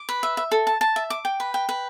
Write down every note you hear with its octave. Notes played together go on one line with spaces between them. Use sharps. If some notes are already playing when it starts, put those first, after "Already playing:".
Already playing: D6
B4
E5
E5
A4
A5
A5
E5
D6
G5
B4
G5
B4